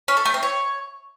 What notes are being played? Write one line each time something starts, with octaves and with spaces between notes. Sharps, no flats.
C#4
A4
A3
C4
C#5